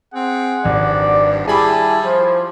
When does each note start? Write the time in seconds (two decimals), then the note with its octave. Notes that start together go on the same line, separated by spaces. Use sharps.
0.14 C4 G#4 F#5
0.65 G#1 G2 D5
1.48 G3 E4 G#4 G#5 A5 B5 D6
2.04 F3 C5